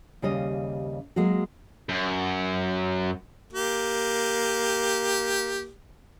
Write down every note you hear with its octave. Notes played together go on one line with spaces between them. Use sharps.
D#2 C#3 G3 D#5 F5
F#3 G#3 A#3 F#4
F#2
A#3 G4